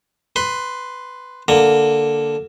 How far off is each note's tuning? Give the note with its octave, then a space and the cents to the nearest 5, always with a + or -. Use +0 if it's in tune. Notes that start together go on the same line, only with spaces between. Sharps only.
B4 +10 C6 +0
D3 +0 A#3 +0 A#5 -20